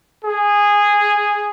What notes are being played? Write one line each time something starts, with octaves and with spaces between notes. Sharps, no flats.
G#4